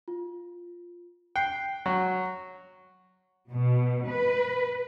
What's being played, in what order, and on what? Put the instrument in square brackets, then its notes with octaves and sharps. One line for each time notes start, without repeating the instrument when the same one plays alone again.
[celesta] F4
[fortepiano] G5 [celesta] F#6 C7
[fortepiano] F#3 [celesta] C#6
[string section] B2
B4